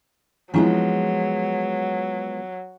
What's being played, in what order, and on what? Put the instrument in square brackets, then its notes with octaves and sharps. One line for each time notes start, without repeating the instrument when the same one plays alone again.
[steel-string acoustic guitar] F3 G#3 B3 [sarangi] F#3 [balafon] C4 D4 E4